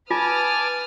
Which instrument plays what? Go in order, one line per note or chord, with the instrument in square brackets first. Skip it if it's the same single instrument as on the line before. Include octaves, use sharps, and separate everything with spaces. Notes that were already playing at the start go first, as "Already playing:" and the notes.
[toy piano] F4 [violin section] B4 D#6 F6 [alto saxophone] G#5 [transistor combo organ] A5 D6